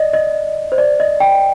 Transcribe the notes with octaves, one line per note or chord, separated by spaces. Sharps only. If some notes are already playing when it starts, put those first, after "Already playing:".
Already playing: D5 D#5
D#5
C5
D5
D#5
G5